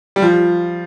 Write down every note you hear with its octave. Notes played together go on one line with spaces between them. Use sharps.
G3
F3